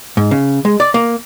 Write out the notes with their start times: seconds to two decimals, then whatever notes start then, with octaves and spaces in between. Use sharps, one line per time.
0.17 G#2
0.31 C#3
0.65 G#3
0.80 D5
0.94 A#3